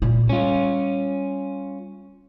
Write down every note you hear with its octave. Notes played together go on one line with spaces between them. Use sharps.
A#2 E4
G3 C#4 F4